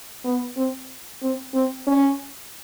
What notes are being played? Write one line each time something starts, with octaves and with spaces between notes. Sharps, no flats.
B3
C4
C4
C4
C#4